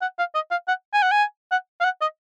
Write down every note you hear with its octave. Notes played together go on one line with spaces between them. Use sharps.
F#5
F5
D#5
F5
F#5
G#5
F#5
G#5
F#5
F5
F#5
D#5